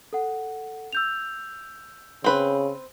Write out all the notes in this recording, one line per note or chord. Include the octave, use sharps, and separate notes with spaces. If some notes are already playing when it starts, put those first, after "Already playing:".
A4 F#5
E6 G6 F7
C#3 C4 B4